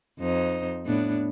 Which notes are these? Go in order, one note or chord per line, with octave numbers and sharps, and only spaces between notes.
F2 D#4 C5
A2 B3 D4